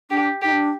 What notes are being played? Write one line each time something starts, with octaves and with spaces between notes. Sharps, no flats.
D4 G4
D#4 G4
D4